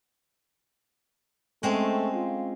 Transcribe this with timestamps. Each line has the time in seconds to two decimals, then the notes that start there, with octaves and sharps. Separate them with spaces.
1.63 G#3 A3 C4 C#4
2.13 F4